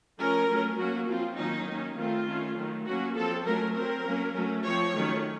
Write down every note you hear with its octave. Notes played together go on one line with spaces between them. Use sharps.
F3 A3 C#4 A#4
F#3 A3 C#4
F#3 A#3 C#4 F#4
F3 C4 F4
D#3 F#3 A#3 C#4 D#4
D#3 A#3 C#4
D#3 A3 C4 F4
D#3 A3 C#4
D#3 F#3 A3
F#3 A#3 C#4 F#4
F3 C4 A4
F#3 A3 C#4 A#4
F#3 C4 A#4
F#3 A#3 C#4
F#3 A3 C#4
F3 C4 C#5
D#3 F#3 A3 C#4